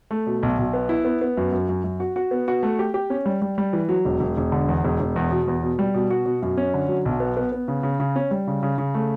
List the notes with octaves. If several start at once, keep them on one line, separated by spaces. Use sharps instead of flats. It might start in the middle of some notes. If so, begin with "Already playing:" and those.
A3
B2
B1
B1
B3
E4
B3
B3
F#2
F#2
F#2
F#2
F#4
F#4
B3
F#4
A3
G4
G4
C#4
G3
G3
G3
E3
F#3
E1
E1
E1
D3
E2
E1
E1
E2
B2
E2
B2
G3
B2
F#4
B2
F#2
C#4
D3
F#3
B1
B3
B3
B3
C#3
C#3
C#3
C#4
G3
C#3
C#3
C#3
A3